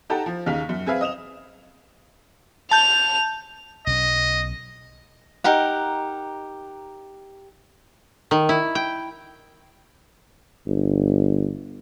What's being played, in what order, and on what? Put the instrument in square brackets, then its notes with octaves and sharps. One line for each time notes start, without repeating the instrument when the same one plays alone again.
[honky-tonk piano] D#4 G4 A4 F#5 A5 A#5
F3
D#2 C#3 D#4 F5 B6 F7
F#2
C4 G#4 B4 E5 F5 G#5
D#5 D#6 E7 F7
[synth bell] A5 G6 [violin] F7
[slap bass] B1 C#4 [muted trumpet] D#5
[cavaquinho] D#4 G4 A#4 F#5
[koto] D#3
E4
G5
[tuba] G1